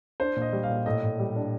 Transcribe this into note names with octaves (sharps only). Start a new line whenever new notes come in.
D4 C5
A#2
D#5
G3
F5
A#2
A2 D#5
A2
G3
D4